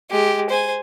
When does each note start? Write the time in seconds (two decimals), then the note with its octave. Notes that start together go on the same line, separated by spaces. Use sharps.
0.10 G#3 G4
0.50 C5 G#5